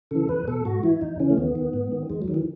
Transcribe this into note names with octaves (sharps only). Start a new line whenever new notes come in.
C#3 E3 A4
E2 B4
B2 A4
G#2 F#4
E3 E4
E2 D#4
C#3 E3 C#4
A3
D#2 B3
D#3
G#2
D#3
E2 G#3
F#3
D#3
E3